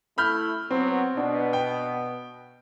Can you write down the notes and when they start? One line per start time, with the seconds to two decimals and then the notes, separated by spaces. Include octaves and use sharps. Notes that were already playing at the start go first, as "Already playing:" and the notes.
0.18 A3 E4 B5 F6 G6
0.71 F#3 B3 C4
1.17 B2 B3 D4
1.53 G5